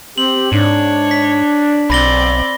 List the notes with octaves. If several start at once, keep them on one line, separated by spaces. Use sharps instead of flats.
C4 G4 F#7
G#2 D4 C#5
B6
B1 C4 D5 B5 A#6 G7